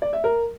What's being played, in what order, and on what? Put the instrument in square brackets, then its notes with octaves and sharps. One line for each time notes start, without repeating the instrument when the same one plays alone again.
[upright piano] D5
E5
A#4